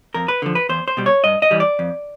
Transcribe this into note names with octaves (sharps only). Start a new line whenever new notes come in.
F2 A#4
B4
D3 F3
B4
E2 C5
C5
B2 G3
C#5
G2 D#5
D#5
E3 G3
D5
F2